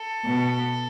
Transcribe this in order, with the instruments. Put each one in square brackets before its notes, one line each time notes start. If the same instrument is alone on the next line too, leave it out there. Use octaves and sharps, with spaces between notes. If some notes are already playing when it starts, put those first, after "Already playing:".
Already playing: [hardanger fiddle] A4
[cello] B2